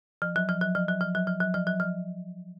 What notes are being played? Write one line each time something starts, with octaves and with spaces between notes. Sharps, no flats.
F3
F#3
F3
F#3
F3
F#3
F3
F#3
F3
F#3
F3
F#3
F3